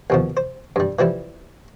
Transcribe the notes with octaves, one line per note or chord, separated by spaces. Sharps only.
D#2 B2 F3
C5
G2 G3
E3 F3 G3 E4